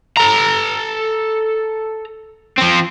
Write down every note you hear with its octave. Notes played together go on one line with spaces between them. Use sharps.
A4 A#5
F3 C4